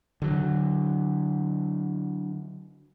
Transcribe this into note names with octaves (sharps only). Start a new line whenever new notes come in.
D3 F#3